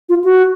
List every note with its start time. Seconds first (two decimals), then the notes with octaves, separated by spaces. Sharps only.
0.09 F4
0.24 F#4